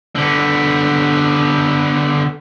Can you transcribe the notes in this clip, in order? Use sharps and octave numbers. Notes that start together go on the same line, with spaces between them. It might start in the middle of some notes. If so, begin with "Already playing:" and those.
D3 B3